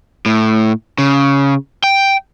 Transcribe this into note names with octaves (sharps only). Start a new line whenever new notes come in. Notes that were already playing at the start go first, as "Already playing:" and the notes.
A2
C#3
G5